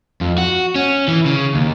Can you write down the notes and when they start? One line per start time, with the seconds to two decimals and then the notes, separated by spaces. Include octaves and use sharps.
0.21 F2
0.38 F#4
0.75 C#4
1.08 E3
1.26 C#3
1.55 D#2